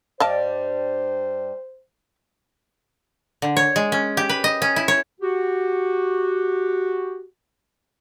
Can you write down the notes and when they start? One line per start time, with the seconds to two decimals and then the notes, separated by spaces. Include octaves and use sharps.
0.20 G2 G3 C5 D5 D#5 F5 A5
3.42 D3
3.57 C#5
3.76 G#3
3.92 C#4
4.17 G4
4.29 B4
4.44 D#5
4.62 C#4
4.76 E4
4.88 C#5
5.21 F#4 G4